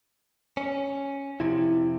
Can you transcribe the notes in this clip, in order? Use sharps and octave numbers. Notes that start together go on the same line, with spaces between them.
C#4
F2 C3 E4